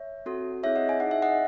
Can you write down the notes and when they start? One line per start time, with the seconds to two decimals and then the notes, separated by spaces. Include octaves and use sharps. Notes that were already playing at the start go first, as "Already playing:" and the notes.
Already playing: C#5 E5
0.26 C4 F#4 A4
0.63 C4 E4 G#4 C#5 E5
0.76 D#5 F#5
0.89 G#5
1.00 D#4 G#4 F#5
1.11 E5
1.22 D#5 F#5